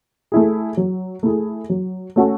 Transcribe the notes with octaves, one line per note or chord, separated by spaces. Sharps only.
A3 E4 G#4
F#3
A3 E4 G#4
F#3
A3 C#4 F#4 A4